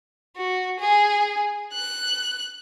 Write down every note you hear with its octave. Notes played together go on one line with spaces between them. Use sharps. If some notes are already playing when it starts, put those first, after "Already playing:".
F#4
G#4
F#6